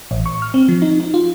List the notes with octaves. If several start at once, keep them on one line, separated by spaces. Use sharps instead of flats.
A1
C#6
F6
C4
F3
D#4
D#4
F4